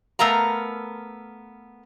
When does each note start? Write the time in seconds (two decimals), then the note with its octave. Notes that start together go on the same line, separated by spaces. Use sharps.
0.19 A3 B3 A#4 F5 A#5